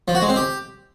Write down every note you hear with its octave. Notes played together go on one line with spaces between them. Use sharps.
F3
F#4
G#3
C4
G4